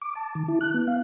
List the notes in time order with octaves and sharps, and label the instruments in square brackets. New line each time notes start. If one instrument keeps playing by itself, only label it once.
[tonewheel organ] D6
A5
D#3
E4
F#6
B3
F5